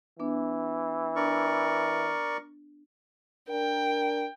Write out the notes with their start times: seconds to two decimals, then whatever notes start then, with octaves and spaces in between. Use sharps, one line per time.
0.20 E3 B3 D4
1.16 D4 A#4 D5 C#6
3.49 D4 A#4 G5